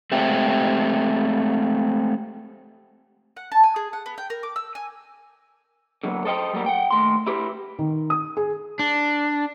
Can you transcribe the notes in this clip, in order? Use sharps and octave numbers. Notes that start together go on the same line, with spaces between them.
G#3 A3 C4 G4
F#5
A5
G#5
G#4
F#5
B3
G5
A#4
D6
E6
G#5
D3 F#3 A#3 B3
A4 C5 D#5 E5 G5
F#3 G3 A#3 B3
F#5 G5
D#2 A3 C6
E4 G4 B4
D#3
D#6
G#4
D4